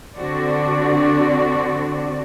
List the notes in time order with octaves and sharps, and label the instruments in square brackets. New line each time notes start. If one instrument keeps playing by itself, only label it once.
[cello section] D3 C4 D4 F#4 D5